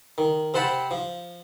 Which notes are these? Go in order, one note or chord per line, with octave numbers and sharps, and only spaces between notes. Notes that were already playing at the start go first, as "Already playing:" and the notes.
D#3
C3 C4 C5 F#5 A5 B5
F3